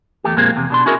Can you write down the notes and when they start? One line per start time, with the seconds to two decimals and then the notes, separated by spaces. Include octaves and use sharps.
0.24 E2 A3 G4
0.36 F2 A#2 G#3 A#3 C4
0.56 E2 C3
0.70 B2 D4 C6
0.86 C#4 E4 F#4 G#4 A#4 D#5